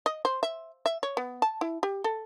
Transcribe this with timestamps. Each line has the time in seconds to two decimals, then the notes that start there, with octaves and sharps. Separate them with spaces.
0.06 D#5
0.25 C5
0.43 E5
0.86 E5
1.03 C#5
1.17 B3
1.42 A5
1.61 E4
1.83 G4
2.04 A4